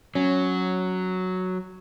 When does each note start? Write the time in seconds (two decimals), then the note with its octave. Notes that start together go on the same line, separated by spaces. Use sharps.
0.15 F#3 C#4